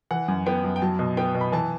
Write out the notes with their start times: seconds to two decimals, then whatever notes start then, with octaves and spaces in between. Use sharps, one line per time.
0.11 E3 F#5
0.28 F#2
0.46 B3 G5
0.64 F#2
0.76 G5
0.82 F#3 A5
0.99 B2
1.17 B3 G5
1.35 B2
1.41 B5
1.52 E3 A5